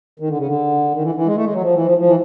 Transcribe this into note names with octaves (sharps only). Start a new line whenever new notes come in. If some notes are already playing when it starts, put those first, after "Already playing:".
D#3
D3
C#3
D3
D#3
E3
E3
G#3
A3
G#3
F#3
F3
E3
F3
F3
E3